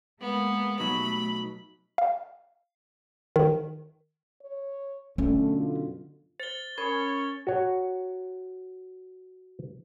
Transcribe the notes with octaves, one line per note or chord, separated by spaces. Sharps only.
G#3 A#3 B3
B2 F#3 A3 D#4 B5
F5
D#3
C#5
F#2 B2 D3 A3 C#4
F4
C5 A6 G7
C#4 A#4 C#5 B5 G#6
F#4 C#5